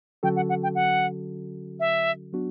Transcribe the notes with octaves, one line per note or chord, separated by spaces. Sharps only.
D3 F#3 C#4 F#4 A4 G5
F#5
F#5
G5
F#5
E5
F#3 B3 D4 F#4